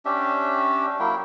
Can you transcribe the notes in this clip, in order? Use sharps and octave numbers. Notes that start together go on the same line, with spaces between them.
C#4 D4 G4 E5
F#3 A#3 E4 G5